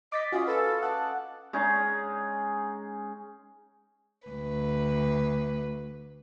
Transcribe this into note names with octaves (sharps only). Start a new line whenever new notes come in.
D#5 D6 A6 B6
C#4 F4 F#4 D#5 F5
A4 B4
F#5 A5 D6
G#3 C#4 D#4 G#4
D2 B4